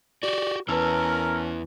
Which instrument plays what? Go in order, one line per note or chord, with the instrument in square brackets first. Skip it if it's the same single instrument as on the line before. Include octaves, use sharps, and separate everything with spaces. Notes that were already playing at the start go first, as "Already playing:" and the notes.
[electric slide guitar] F#4 G4 [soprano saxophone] D5
[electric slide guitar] E2 E3 [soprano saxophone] C#4 [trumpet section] A#4 [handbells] B4 A5 E6